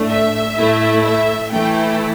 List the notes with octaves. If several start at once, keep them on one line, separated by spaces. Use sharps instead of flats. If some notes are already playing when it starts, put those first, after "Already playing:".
Already playing: A2 A3 D4
E5
A2 A3 E4
E5
E3 A3 E4 G5